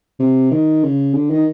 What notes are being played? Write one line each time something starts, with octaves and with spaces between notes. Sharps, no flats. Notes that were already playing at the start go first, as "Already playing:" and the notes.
C3
D#3
C#3
D3
D#3